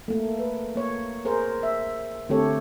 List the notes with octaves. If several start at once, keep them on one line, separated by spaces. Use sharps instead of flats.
A3 A#3
B4
A#3 C#5
G#4 A#4 C5
E5
D3 A3 C4 G4 A4 C#5